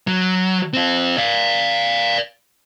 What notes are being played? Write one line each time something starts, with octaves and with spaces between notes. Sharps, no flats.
F#3
C4 F4
D5 F5